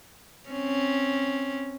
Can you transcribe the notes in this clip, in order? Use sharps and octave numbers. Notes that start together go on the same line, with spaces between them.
C4 C#4